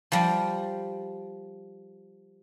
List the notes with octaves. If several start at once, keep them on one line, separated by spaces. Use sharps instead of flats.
F3 G3